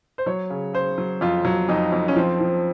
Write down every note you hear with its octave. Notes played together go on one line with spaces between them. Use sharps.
C5
F#3 C#5
C#3
C#3 C5
F#3
F2 F4
F#3
F2 D#4
F2
C#4
F3 C4
F3